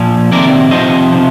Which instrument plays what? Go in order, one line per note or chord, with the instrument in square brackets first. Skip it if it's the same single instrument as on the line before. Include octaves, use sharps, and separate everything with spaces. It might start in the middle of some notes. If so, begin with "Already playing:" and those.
Already playing: [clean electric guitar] A#2 F3
C3 D#3 A#4 D5
C3 F3 C5 D#5
C3 F3